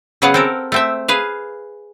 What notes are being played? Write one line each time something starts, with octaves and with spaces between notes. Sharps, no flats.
C#3 F#3 B3 G#4 F5 F#5
C4 A4 A#4
A3 C4 E5
G#4 B4 F5